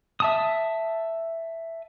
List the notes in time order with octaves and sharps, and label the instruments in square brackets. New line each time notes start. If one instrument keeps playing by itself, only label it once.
[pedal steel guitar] E5 A5 D#6